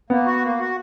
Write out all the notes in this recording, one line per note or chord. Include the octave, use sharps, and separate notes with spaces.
A#3 B3
F#4
A#3
F#4